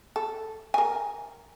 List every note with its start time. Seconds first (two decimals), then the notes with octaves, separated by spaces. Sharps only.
0.16 A4
0.74 A#4 G#5